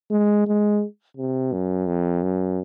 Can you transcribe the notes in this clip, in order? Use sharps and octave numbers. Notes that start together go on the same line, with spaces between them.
G#3
G#3
C3
F#2
F2
F#2